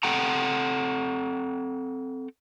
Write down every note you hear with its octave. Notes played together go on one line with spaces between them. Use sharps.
C4 A4 F#5 G5 A#5